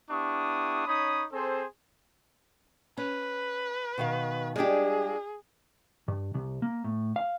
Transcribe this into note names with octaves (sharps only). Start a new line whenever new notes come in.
B3 D4 E4 G4 C#6 D#6
C#4 D#4 C#5 B5 D#6
C4 G#4 A4 C5
C#4 B4
B2 D#3 F5
G3 G#3 D4 F4 G4 G#4
G2
C2
A#3
A2
F5